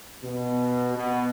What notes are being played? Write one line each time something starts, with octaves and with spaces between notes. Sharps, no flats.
B2
B2